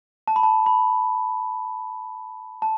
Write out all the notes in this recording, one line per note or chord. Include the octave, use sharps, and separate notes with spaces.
A5
B5
A5
B5
A5